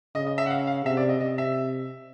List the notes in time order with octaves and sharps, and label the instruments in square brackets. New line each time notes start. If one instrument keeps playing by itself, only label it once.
[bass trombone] C#3 [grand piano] D#5
[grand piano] D#5
E5
F#5
F5
F5
[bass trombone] C3 [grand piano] E5
[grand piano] D5
D#5
[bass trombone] C3 [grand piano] D#5
[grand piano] E5